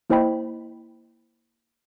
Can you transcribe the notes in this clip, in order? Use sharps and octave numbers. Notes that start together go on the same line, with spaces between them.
A#3 E4 C5 D#5 G5 B5